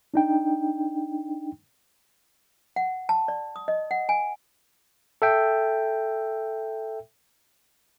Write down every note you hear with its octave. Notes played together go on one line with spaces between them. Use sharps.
D4 D#4 G5
F#5
A5
D5
D#6
D#5
F#5
G#5
A4 E5 G5